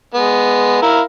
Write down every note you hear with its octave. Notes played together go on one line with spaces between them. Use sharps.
G#3 B3
E4 A#4 F5